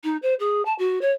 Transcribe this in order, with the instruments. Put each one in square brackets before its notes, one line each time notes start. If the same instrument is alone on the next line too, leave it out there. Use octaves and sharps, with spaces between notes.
[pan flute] D#4
C5
G#4
A5
F#4
C#5